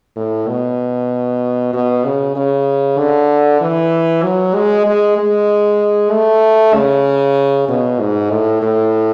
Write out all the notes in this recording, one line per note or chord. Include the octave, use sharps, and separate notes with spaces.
A2
B2
B2
C#3
C#3
D3
E3
F#3
G#3
G#3
G#3
A3
C#3
B2
G#2
A2
A2